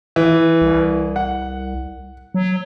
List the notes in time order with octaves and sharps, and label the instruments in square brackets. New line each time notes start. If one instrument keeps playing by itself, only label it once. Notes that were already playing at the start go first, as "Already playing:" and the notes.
[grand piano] E3
[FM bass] C2
[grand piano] F#5
[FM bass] F#3